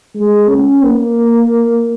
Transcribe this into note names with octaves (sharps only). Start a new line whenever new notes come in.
G#3
C#4
A#3